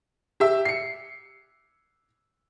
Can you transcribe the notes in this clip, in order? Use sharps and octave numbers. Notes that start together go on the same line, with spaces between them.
G4 E5
C7 C#7